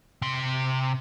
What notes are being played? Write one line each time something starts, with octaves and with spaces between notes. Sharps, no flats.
C3 C6